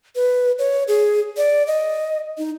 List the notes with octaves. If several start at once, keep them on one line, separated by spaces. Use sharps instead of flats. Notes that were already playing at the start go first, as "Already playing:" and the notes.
B4
C#5
G#4
D5
D#5
D#4